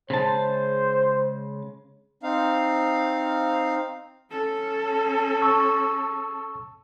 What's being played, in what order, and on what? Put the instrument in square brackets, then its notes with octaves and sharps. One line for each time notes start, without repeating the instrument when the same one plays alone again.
[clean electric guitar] C#3 G#3 A5 [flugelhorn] C5
[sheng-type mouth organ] C4 D#4 F5
[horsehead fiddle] C#4 A4
[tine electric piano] A5 C#6 E6